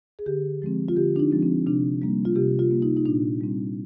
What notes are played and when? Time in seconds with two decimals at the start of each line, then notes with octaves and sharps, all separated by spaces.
0.19 G#4
0.26 D3 G4
0.62 F3 G#3 C4
0.88 F4
0.96 D3 G4
1.16 D4
1.19 D#4
1.32 F3 G#3 C4
1.43 C4
1.66 C3 D4
2.02 G3 A#3
2.25 F4
2.35 C3 G4
2.59 F4
2.71 G3 A#3
2.82 D#4
2.97 D#4
3.06 A#2 D4
3.41 G3 C4